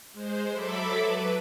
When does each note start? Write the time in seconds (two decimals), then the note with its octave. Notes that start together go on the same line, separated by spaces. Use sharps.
0.13 G#3 C5
0.51 F#3 A4 E5 B5 D6
1.01 B4